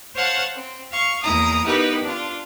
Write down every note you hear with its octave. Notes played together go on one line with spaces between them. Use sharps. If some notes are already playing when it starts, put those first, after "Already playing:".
C5 C#5 F5 F#5 A5
C4
F5 C#6
E2 A#3 E4 A#5 D#6
B3 D#4 E4 G4 A#4 B4
D4 F4